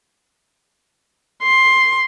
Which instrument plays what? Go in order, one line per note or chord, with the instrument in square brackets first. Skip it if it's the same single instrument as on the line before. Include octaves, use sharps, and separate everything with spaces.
[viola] C6